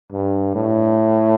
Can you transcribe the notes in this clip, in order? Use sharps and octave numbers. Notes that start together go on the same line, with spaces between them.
G2
A2